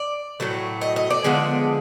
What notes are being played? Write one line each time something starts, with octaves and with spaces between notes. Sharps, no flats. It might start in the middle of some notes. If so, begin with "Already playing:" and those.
Already playing: D5
A2 F#3 A3
D#5
D#5
D5
D3 F3 G#3 B3